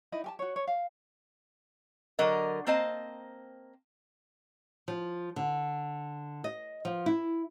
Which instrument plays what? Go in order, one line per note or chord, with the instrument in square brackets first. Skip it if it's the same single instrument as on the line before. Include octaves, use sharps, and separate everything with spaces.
[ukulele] D#4 E4 D#5
G4 G#5 A5
F#4 C#5
C#5
F5
[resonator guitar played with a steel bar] D3 F#3 A#4 D#5
A#3 C4 C5 D#5 A5
[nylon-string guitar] F3
D3
D#5
F3
E4